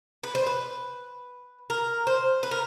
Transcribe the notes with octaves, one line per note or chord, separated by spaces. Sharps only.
B4
C5
B4
A#4
C5
B4
A#4